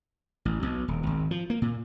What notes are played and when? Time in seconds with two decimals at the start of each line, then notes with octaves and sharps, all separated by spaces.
0.45 A1
0.63 B1
0.88 D#1
1.07 G#1
1.31 F3
1.50 A#3
1.62 A#2